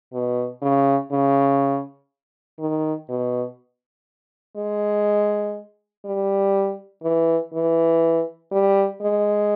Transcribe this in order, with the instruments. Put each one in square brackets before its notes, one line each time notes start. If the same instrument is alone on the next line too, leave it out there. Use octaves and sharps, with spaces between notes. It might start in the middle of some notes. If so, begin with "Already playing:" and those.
[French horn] B2
C#3
C#3
D#3
B2
G#3
G3
E3
E3
G3
G#3